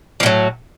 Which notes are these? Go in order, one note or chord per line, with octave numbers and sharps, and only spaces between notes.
A2 F3 F#3